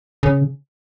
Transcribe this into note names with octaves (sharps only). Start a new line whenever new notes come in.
C#3